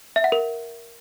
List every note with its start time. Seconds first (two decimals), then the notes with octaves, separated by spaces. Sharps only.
0.16 E5
0.24 F#5
0.32 A#4